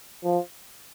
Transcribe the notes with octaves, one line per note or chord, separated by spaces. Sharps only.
F3